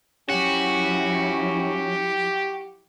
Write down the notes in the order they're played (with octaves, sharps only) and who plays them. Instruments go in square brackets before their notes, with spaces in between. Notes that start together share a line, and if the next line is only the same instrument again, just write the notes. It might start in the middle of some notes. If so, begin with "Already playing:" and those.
[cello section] F3 F#3 E4 [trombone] C#4 [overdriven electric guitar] F#4 [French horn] G4